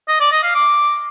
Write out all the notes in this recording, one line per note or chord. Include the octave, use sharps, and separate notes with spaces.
D#5
D5
D#5
F5
D6